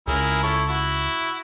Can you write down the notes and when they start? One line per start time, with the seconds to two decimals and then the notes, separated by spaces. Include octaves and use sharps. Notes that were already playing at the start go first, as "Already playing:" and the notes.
0.08 C#2 C#3 E4 G#4 A#4
0.43 E4 A4 C#5
0.69 E4 F#4